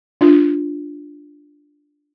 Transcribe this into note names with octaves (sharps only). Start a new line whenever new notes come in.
D4 F4